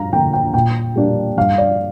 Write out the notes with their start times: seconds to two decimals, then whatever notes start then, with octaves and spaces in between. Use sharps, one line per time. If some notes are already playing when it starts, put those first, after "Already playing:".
Already playing: G2 F5 A#5
0.13 D3 A#3 G5
0.33 G5
0.54 A#2 G5
0.96 G3 A#3 D4
1.37 G2 F5
1.58 D5